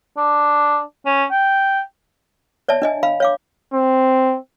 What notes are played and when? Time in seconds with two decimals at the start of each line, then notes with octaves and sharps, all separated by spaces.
0.17 D4
1.06 C#4
1.31 G5
2.68 C#5 D5 E5 A5
2.82 D4 D#5 G#5
3.03 F5 B5
3.20 C#5 F5 D6
3.74 C4